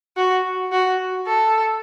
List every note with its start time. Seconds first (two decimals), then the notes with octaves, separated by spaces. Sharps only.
0.17 F#4
0.72 F#4
1.27 A4